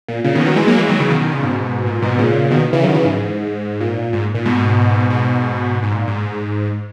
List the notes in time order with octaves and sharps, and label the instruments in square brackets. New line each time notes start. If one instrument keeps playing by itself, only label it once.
[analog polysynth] A#2
A#2 C#3
B2 D#3
E3
D#3 F#3
E3 G#3
F#3 A#3
E3 G#3
D#3 F#3
C#3 E3
B2 D#3
B2 D#3
A#2 C#3
G#2 B2
A#2
G#2 B2
A#2 C#3
B2 D#3
C#3 E3
D#3 F#3
C#3 E3
G#2
A#2
G#2
A#2
G#2 B2
G#2 B2
G#2
A#2
G#2